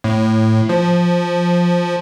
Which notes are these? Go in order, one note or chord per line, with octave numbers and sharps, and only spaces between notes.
A2
F3